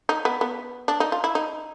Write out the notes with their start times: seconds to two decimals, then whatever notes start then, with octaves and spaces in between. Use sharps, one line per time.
0.09 D#4
0.25 B3
0.41 B3
0.88 D4
1.00 D#4
1.12 F4
1.24 E4
1.35 D#4